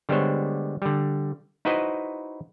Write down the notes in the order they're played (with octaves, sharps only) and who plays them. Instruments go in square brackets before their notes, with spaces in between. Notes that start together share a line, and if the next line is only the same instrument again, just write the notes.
[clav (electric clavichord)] D3 G3 G#3 B3 C5 C#5
D3 G3
D#4 E4 F#4 B4 C5 D#5